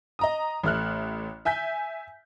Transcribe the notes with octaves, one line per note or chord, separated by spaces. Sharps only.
D#5 A#5 D#6
A1 A3 F6 F#6
E5 G#5 G6 B6